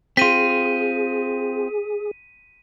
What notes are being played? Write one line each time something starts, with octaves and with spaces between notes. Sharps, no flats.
C4 F4 G#4 B6 D#7